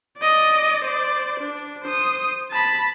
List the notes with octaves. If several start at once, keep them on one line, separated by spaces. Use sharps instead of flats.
D5 D#5
C5 D5
D4
C5 D#6
A5 B5